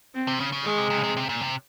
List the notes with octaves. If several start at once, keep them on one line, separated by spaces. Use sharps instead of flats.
C4
C3
C#3
C#3
D#3 G#3
C3
C3
C#3
C3
C3
A#2
C3